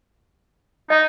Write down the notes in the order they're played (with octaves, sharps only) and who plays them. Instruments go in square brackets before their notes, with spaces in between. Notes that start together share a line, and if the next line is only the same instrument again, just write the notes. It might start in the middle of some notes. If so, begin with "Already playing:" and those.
[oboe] D#4 [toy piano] D#5